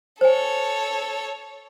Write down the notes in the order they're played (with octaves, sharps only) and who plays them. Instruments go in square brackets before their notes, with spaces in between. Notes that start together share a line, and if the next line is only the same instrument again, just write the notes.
[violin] A4 C#5 [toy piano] C5 G#5